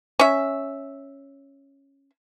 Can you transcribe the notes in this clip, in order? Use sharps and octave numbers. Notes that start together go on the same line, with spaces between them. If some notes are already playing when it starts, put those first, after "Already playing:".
C#4 E5